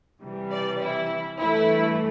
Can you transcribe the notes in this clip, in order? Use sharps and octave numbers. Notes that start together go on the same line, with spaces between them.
C3 E3 G3
D5
E4
G2 E3 A3 E4